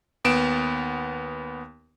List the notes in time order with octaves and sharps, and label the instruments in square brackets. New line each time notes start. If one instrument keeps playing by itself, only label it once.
[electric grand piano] D#2 B3 D7 E7